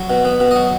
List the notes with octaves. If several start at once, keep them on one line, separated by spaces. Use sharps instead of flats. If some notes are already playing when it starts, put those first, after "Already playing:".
Already playing: F#3
B2
B3
B2
F#3 D#5